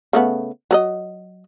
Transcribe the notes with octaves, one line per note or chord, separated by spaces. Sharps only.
C#3 A3 B3
F#3 B4 D#5